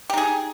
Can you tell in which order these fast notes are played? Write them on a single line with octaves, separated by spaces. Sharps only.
G4 D#4 G#4